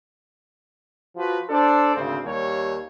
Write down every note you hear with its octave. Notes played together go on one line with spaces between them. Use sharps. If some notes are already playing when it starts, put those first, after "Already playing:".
F3 F4 F#4 B4
D4 A4 C5 D5
G#1 D2 C#3 C4
D#2 G3 C#5